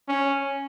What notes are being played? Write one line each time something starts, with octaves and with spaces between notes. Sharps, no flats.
C#4